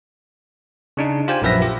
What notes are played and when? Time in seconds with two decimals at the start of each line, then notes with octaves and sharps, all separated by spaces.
0.97 C#3 D4 D#4
1.28 F4 G4 C5 G5 G#5
1.42 A#1 F#2 F3 B4 E5 A#6
1.62 G4